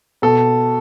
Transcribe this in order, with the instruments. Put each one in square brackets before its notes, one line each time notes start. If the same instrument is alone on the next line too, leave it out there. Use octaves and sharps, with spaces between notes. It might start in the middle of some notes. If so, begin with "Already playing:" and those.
[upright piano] B2 [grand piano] A4